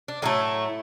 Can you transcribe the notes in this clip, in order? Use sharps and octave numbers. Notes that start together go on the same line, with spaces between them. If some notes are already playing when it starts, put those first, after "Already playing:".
D4
A2 F#3 A3 E4